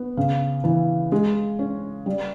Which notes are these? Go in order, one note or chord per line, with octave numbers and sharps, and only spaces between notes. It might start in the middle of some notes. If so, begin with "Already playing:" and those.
Already playing: B3
C#3
E3
G#3
C#4
G3